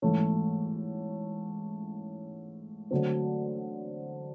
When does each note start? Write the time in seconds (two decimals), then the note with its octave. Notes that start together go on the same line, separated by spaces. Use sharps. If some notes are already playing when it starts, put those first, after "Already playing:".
0.02 G#2 E3 A3 C#4
2.91 D3 F#3 A3 C4